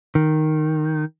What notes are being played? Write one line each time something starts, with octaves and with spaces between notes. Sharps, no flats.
D#3